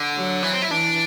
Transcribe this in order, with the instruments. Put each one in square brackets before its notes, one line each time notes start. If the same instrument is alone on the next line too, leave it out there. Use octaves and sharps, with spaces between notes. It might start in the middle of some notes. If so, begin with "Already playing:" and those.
Already playing: [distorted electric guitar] D3
[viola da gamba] F#3
[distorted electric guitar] E3
C4
E4
[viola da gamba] E3 [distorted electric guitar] D4